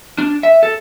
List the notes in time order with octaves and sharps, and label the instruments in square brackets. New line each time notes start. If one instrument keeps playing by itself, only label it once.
[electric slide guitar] D4
E5
A4